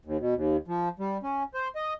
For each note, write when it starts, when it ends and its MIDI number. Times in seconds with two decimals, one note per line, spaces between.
0.05 0.17 39
0.20 0.34 47
0.35 0.57 39
0.68 0.89 53
0.99 1.17 55
1.23 1.43 61
1.54 1.68 72
1.76 1.94 75